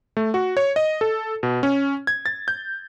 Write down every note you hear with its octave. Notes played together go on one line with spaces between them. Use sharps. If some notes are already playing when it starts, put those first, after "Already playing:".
A3
F#4
C#5
D#5
A4
B2
C#4
G#6
A6
G6